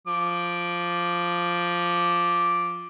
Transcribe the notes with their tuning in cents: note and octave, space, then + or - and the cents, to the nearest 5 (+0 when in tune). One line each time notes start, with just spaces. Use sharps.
F3 +0 D6 +0